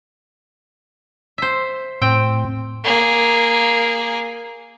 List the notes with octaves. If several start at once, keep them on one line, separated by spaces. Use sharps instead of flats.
C5 E5
A2 C4 G5
A#3 G#4